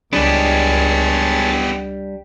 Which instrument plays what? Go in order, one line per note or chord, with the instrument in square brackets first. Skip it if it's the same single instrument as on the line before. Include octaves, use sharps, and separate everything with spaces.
[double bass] C#2 [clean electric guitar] G3 D4 [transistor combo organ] G#3 C#5 A5 [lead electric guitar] B3 G4